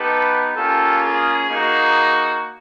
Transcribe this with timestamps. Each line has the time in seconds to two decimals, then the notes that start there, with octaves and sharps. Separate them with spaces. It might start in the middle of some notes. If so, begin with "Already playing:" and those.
Already playing: B3 D#4 G4 A4 B4
0.55 A#3 C#4 F4 G4 A4
1.03 G#4
1.49 A#3 D#4 F#4